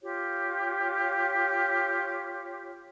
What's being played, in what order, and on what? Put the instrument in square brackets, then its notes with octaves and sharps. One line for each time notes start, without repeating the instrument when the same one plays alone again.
[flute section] F4 G4 C#5